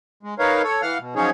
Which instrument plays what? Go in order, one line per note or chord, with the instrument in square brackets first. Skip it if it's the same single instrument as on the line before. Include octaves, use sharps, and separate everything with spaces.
[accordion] G#3
D#4 A#4 B4 C#5 F5
A4 C#5
E3 F5 F#5 F6
B2
F3 F#3 C#4 D#4 G#4 C#5